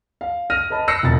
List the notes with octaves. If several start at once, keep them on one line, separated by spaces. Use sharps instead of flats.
F5
F6 A#6 D#7
B4 D#5 A5 B5
E6 F#6 A#6 C7 C#7
E1 F2 A6